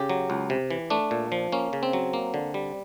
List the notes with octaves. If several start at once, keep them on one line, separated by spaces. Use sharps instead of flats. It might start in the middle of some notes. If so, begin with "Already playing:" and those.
Already playing: C#3 G4
F#3
C#2
C3
E3
A3 D4
A#2
F3
A#3 C#4
C#3
C4
F#3
A#3
D3
G3